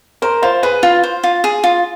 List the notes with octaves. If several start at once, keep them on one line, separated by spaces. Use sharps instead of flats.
A#4 C5
F4 C5
G#4 B4
F4
C5
F4
G#4
F4